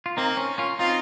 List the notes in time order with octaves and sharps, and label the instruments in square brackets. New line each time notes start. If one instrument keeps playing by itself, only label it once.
[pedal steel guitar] F4
[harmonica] A#3 [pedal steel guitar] C4 D#4
[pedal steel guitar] C#4
C#4 F4
[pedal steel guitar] C4 D#4 [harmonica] F4